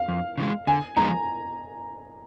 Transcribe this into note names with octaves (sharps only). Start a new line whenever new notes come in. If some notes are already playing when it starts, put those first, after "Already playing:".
Already playing: F5
F2
C#3 E3 G#3
D3 G#5
F3 G#3 B3 D#4 A#5